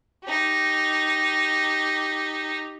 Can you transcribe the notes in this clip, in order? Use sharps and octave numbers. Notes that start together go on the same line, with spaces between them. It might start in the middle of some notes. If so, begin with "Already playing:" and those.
D#4 G4